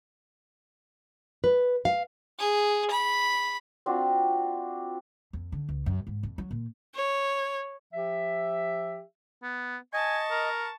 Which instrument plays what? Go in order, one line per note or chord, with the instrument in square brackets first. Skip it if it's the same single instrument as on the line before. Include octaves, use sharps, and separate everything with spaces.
[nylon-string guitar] B4
F5
[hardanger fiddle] G#4
B5
[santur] C4 D4 F4 F#4
[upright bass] F2
D3
C#2
F#2
G#2
F2
F#3
A#2
[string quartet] C#5
[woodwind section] F3 G4 E5
[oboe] B3
[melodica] D#5 [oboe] G#5 [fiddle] A5 C#6
[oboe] A#4